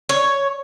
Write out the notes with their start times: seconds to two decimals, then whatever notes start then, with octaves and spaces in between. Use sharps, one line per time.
0.09 C#5